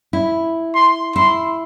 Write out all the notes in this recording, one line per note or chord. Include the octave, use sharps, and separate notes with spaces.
E4
C6
E4 C6